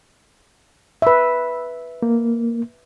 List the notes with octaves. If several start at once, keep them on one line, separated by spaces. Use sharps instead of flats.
B4 E5
A#3